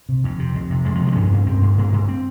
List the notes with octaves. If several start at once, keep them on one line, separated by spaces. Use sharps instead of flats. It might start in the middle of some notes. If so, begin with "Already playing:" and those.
C3
F2
C3
F2
C3
F2 G#3
F3
C3
G3
C4
G2 C#4
G2
G2 C4
G2
G2 A#3
G2
C4